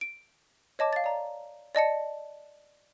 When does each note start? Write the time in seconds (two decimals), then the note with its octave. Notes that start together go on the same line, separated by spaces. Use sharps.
0.01 D7
0.79 C#5 D#5 A5 D6
0.93 F5 A6
1.04 D5 A#5
1.75 D5 D#5 A5 C#7